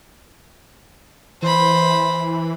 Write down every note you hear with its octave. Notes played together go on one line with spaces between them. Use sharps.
E3 C5 B5